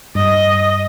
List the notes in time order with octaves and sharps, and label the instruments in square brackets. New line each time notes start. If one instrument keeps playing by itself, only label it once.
[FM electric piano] G2 [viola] D#5